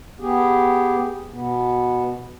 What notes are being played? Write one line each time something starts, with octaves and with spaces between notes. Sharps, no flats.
B3 G4 G#4
B2 B3